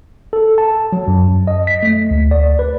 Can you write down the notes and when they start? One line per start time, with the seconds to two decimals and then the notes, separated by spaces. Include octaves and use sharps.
0.33 A4
0.58 A5
0.93 F#3
1.08 F#2
1.47 D#5
1.67 B6
1.83 A3
2.11 D2
2.31 D5
2.59 B4